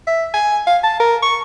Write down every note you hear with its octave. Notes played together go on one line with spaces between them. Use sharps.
E5
G#5
F5
A5
A#4
C#6